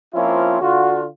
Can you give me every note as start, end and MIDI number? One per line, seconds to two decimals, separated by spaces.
0.14 0.61 53
0.14 0.61 58
0.14 0.61 60
0.14 0.61 61
0.14 0.61 64
0.14 0.61 65
0.62 1.05 50
0.62 1.05 65
0.62 1.05 66